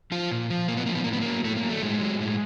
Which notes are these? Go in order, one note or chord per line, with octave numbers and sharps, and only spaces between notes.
F3 F4
A#2
F3
A#2 A#3
B3
F3 A#3
B3
A2 A#3
B3
F#3 A#3
A2 A3
A#3
F#3
A3
A2 G#3
F#3
A2